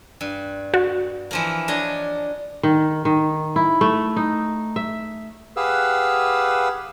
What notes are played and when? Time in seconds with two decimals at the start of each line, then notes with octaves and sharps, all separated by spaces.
0.21 G2
0.74 F#4
1.31 E3 F3 A#3
1.68 D4 C#5 D#5
2.63 D#3
3.05 D#3
3.56 E4
3.81 A3
4.16 D#4
4.76 E5
5.56 G4 G#4 B4 F5 F#5 E6